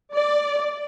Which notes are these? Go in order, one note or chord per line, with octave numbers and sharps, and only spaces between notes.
D5